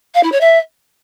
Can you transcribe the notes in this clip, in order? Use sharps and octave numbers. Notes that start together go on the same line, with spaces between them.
F5
E4
C#5
E5